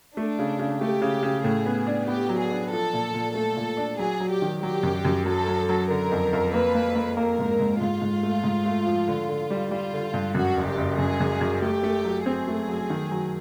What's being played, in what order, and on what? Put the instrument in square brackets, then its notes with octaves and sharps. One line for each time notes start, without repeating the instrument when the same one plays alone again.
[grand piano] A3 [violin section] D4
[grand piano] C#3
C#3
[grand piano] A3 [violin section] G4
[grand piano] C#3
C#3
[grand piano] A2 [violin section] G#4
[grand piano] B3
D4
[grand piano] B3 [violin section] G4
[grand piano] F#3
[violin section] G#4
[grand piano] D4
[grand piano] F3 [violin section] A4
[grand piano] A#2
A#2
[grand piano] A3 [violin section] A4
[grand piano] A#2
D4
[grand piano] F#3 [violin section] G#4
[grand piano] F#3
[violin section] G4
[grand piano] D#3
[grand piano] F#3 [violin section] G4
[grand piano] F#2
F#2
[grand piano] F#3 [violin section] A4
[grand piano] F#3
F#3
[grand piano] D3 [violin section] A#4
[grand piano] F2
F2
[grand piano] A#3 [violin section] B4
[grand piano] A#3
A#3
[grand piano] A#3 [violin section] A#4
[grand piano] G#2
G#2
[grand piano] G#2 [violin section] F4
[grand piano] G#2
A3
G#2
A3
F3
D3
D3
G3
[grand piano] G3 [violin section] F4
[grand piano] D3
G2
[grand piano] F#2 [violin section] F#4
[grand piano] F#1
[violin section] G4
[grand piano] F#1
[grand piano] F#2 [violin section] G#4
[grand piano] F#2
F#2
[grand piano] A3 [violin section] G4
[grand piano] A3
F#3
[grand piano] C4 [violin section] G#4
[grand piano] A3
F#3
D#3
F#3